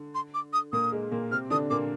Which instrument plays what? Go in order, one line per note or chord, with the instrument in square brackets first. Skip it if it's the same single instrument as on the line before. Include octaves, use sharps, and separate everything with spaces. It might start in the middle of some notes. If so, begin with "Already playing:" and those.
Already playing: [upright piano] D3
[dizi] C6
D6
D#6
[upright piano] A#2 A#3 [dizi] D#6
[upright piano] G#3
A#2 A#3
[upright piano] C3 C4 [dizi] F6
[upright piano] D3 D4 [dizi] D#6
[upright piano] A#2 A#3 [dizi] D6